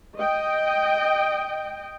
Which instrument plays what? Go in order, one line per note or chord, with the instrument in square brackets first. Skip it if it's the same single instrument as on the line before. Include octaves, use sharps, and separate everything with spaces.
[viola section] D#5 G5